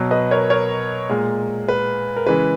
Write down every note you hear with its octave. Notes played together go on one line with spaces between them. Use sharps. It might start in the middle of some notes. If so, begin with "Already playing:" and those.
Already playing: B2 F#3
B4 D#5
A#4 C#5
A#4 C#5
A#2 G#3
B4
A#4
C#3 E3 G#3 B4